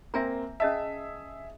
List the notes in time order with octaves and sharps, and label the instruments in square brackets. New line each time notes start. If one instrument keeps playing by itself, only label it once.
[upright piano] A#3 C4 [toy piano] E5 G#5 A#5
[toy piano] C#4 D#5 A5 [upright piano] G#4 E5